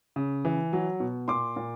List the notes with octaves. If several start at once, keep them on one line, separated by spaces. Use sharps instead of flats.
C#3
E3
F#3
B2
A#2 C6 D6
A#2